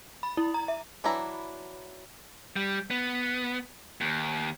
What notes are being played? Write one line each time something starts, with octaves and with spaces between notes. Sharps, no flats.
B5
E4
A#5
E5
E3 F#3 D4 E4 A#5
G3
B3
D#2